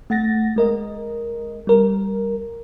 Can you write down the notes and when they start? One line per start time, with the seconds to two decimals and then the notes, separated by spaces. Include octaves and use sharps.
0.10 A3 F#5 A6 A#6
0.56 G#3 A#4 D#5
1.67 G3 A#4